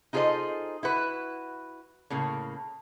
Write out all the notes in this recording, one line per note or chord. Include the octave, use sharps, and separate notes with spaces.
D#4 F4 G#4 A4 C5 D#5
E4 F#4 B4
A2 C#3 A#3